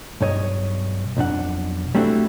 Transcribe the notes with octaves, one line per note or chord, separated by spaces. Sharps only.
B1 G2 C#5 D#5
B1 F2 D4 F#5
G3 A3 C4 D4 E4 F#4